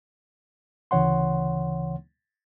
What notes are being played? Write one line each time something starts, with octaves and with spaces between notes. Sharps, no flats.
D2 C#3 E3 C#5 F#5 C6